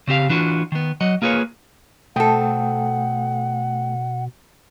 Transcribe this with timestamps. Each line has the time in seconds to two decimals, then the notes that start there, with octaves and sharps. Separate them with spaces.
0.07 C#3 C4 G4 F5
0.29 E3 D4 F4 F#4
0.72 D#3 B3
1.01 F#3 D#5 F#5
1.22 A#3 F4 G#4 B4 C#5
2.16 B2 A3 C4 A4 F#5 G5 D#6